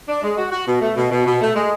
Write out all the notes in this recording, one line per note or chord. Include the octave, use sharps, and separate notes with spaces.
D4
G#3
F#4
F#4
B2
A3
B2
B2
B2
A3
G#3